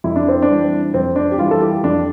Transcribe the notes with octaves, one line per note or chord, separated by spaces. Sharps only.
F2 E4
D4
C4
D4
E3 G3
F2 C4
D4
G4
E3 G3 F4
A4
G4
F2 D4